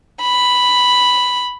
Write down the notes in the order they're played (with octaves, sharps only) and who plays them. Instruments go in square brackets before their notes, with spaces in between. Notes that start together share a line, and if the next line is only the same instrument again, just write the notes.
[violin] B5